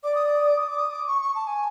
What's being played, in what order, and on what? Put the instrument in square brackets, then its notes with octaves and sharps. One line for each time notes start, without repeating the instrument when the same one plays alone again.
[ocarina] D5 [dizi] D6
[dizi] D#6
D6
D#6
D6
D#6
D6
D#6
D6
C#6
C#6
A5
G#5